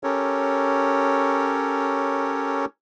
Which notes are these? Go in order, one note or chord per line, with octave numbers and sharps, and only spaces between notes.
C#4 G4 A4 A#4 C#5